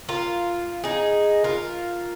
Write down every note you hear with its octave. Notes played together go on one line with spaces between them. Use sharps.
F4 A#4
D#4 G#4
F4 A#4